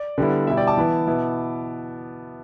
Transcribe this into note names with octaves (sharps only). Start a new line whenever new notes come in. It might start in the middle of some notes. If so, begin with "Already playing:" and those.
Already playing: D5
D3 G3 B3 E4
B2 G3 E4 E5
D5 G5
A5 D6
E3 B3 E4
B2 B3 E4